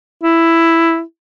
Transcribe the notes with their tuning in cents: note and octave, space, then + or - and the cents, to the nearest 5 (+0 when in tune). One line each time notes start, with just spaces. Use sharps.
E4 +5